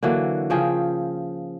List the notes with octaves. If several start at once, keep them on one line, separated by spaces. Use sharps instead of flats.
D3 E3 F#3 A#3
C#3 F3 G#4 G5